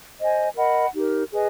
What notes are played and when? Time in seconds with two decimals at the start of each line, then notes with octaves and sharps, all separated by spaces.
0.20 C5 D#5 G#5
0.56 A#4 D#5 F#5 B5
0.94 D#4 G4 A#4
1.31 G#4 B4 D#5 G#5